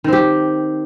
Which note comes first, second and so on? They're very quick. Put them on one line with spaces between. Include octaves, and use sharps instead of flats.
D#3 C4 G4